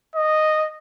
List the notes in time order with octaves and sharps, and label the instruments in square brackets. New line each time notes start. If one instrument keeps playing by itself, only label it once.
[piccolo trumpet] D#5